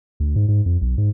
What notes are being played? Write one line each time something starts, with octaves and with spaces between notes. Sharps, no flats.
D2
G#2
G#2
F2
B1
G#2